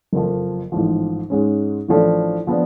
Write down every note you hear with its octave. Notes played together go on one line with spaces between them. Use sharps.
F#1 F2 F3
A1 G#2 F3
G#2 G#3 C#4
A1 A2 F3 A3 D4
F3 B3 D4